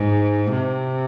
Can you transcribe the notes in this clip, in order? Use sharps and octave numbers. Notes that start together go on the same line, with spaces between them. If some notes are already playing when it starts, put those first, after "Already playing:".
Already playing: G#2
C3